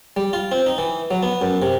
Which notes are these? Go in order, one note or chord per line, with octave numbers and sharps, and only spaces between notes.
G3
F4
C4
D#4
E3
F#3
B3
F#2
C3